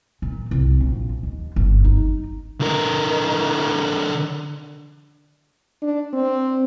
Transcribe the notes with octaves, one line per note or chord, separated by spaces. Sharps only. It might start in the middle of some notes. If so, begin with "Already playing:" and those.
A#2
C2
A#1
D#2
G1
D#4
D3 A#4
D4
C4